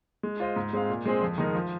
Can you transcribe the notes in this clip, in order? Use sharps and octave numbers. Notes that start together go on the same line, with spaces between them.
G#3
F4 C5 D#5
G#2
G#3 C4 G#4 F5
A#2
G#3 C4 G#4 C5
F2
D#3 G#3 D#4 A#4
F3